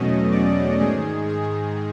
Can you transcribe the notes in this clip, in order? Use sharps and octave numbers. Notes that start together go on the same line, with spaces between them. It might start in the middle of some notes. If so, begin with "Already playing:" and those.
Already playing: E2 B2 F#3 A3 C#4 D#5
D5
G#2 D#3 G#3 G#4
G#4